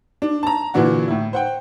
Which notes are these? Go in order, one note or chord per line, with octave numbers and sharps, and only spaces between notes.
D4
A5 A#5
A#2 D3 E3 D4 F#4
A2 E4
C5 F#5 G5